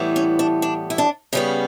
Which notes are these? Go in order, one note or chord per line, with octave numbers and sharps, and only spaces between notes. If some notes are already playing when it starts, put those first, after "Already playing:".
Already playing: A2 E3 G3 B3
C#4
D4
D4
E4
D4
C#3 G3 B3 C#4